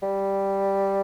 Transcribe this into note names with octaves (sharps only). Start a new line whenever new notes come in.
G3